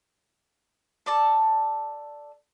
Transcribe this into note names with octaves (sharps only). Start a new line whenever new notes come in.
A4 D5 A5